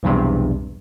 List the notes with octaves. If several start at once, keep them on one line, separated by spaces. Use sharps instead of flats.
B1 E2 G2 C3